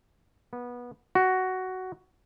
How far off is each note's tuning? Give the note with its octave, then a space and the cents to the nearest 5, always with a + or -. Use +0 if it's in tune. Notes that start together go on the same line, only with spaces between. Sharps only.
B3 -20
F#4 +10